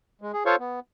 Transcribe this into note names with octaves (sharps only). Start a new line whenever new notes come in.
G#3
G#4
F4 A4 C5 C#5 F5 C#6
B3